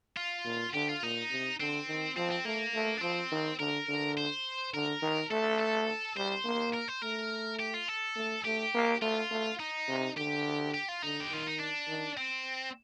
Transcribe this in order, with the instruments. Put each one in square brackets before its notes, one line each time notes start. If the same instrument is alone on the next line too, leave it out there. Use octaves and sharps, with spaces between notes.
[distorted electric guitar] F4
[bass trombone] A#2
[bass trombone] D3 [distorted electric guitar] G4
[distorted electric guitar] F4
[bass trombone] A#2 [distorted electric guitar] D#4
[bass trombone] C3
[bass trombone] D3 [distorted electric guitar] C4
[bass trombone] D#3
[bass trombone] F3 [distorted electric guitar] C4
[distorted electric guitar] C4
[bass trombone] A3 [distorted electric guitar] A#3
[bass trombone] A3
[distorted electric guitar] D4
[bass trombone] F3 [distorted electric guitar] C4
[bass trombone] D#3
[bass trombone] D3 [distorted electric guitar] A#4
[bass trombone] D3
[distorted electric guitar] C5
[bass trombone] D3 [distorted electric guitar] A#4
[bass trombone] D#3
[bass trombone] A3 [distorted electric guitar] A4
[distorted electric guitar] A4
[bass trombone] G3 [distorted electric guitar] C5
[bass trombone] A#3
[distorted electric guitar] A#4
C5
[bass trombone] A3 [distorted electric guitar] A#4
[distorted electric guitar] G4
F4
A4
[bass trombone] A3
[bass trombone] A3 [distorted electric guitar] G4
[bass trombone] A#3
[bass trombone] A3 [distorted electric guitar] F4
[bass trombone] A3
[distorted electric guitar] D#4
[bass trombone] C3
[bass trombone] D3 [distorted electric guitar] G4
[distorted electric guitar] G4
F4
[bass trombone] D3 [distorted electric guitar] D#4
[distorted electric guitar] G4
[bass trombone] D#3 [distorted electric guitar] F4
[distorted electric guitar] D#4
D4
[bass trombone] D#3
[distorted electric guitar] C4